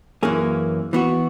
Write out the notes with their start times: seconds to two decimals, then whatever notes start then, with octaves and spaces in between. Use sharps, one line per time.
0.23 F#2 E3 A#3 C#4 G#4
0.93 E3 B3 F#4